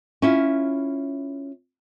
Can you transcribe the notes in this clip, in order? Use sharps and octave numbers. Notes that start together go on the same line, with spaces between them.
C#4 E4 F4